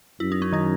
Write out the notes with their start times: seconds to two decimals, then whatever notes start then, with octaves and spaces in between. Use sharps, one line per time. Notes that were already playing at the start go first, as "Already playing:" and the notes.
0.20 F#2 E4
0.32 D#4
0.42 C#4
0.52 D#3 D#4